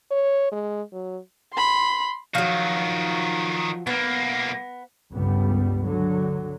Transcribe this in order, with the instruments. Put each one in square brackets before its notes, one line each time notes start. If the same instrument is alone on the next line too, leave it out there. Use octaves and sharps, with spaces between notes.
[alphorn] C#5
G#3
F#3
[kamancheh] B5 C6
[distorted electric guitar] D#3 F#4 [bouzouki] F3 F#3
[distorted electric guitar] B1 A#3 [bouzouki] B3
[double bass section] G1 C#2 G2 G3 B3
D3 F#3